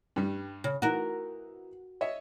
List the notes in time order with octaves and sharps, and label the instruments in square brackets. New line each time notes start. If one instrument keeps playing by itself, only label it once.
[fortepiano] G2 G3
[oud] C#3
[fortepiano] E3 D#4 [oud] F#4 A#4
[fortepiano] C#5 D#5 E5